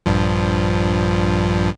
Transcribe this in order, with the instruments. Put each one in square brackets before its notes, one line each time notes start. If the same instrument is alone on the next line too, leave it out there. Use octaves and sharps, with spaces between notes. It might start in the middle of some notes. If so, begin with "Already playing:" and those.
[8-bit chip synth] A#1 G2 F3